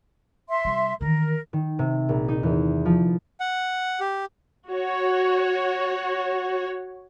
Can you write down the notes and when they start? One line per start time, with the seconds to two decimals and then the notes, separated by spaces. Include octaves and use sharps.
0.49 E5 C6
0.65 C3 G3
1.01 D#3 E3 A#4
1.53 D#3
1.79 C3
2.09 A#1
2.28 D#4
2.43 E2
2.85 F3
3.40 F#5
4.00 G4
4.68 F#4 C#5